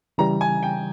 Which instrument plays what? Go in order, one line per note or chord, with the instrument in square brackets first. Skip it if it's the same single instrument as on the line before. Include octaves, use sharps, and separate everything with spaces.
[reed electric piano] C#3 E3 G3 [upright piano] A#5
[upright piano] G#5
G5